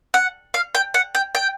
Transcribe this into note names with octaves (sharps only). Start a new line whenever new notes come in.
F#5
F5
G5
F#5
G5
G5